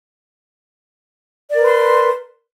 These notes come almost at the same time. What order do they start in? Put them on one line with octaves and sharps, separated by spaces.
D5 A#4 B4 C6